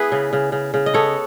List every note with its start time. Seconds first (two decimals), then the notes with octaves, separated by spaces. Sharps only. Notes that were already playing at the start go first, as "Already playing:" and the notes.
Already playing: B3 E4 G#4 B4
0.12 C#3
0.33 C#3
0.52 C#3
0.74 C#3
0.86 D#5
0.94 B3 A4 C#5